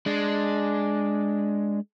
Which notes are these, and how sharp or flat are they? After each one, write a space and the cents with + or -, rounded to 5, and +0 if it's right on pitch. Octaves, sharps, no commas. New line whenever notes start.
G#3 +0 D4 +0